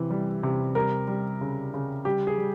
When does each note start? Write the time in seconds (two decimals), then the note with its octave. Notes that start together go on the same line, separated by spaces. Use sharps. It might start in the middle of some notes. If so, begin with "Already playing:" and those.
Already playing: C3 E3
0.10 G3
0.43 C3
0.75 G3 A#4
1.08 G3
1.41 C#3
1.74 C#3
2.05 G3 G4
2.27 G#4
2.38 G3